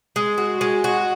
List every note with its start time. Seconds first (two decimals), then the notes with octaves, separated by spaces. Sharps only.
0.16 G#3
0.38 F#4
0.61 G#3
0.84 F#4